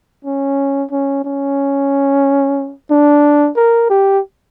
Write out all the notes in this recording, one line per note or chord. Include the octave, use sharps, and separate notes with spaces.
C#4
C#4
C#4
D4
A#4
G4